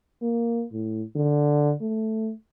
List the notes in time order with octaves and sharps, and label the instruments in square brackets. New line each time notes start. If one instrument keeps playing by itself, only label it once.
[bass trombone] A#3
A2
D3
A3